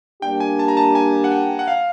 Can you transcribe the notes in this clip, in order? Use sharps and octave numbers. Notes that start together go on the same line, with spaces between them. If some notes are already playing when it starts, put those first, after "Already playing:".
G3 A#3 D4 G4 G5
G#5
A5
A#5
A5
G#5
F#5
G5
F#5
F5